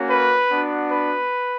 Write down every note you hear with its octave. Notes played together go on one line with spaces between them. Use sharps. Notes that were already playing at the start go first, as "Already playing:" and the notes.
Already playing: A#3 C#4 F#4
B4
B3 D4 F#4
B4